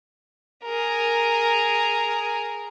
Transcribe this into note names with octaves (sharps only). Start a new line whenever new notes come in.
G#4 A#4